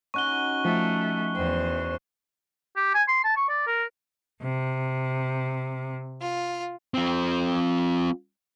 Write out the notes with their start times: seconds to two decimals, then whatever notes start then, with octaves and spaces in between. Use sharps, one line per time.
0.14 C#4 D#4 F#4 C#6 F#6 G7
0.65 F3 A3
1.35 E2 C5 G5
2.76 G4
2.94 G#5
3.08 C6
3.24 A5
3.37 C#6
3.49 D5
3.67 A#4
4.43 C3
6.20 F4
6.94 F3 C4